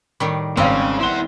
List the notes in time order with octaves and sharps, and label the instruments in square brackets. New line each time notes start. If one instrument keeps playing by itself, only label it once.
[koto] A2 D#3 G3
[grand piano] G#1 F5 [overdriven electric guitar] C#3 [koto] G3 C4
[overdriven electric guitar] E4 F#5 [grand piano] C6 G7